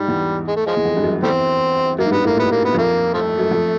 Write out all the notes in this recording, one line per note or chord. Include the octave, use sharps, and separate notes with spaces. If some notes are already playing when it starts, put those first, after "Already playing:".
Already playing: G#2 G3
E2
G#3
A3
F3 G#3
E2
F2
G2
F#2
E2 G3 A3 C4
F#2 A#3
G#2
G2 B3
A2 A#3
A#2 B3
A#3
B3
F2 A#3
F3 A3
F#2
F2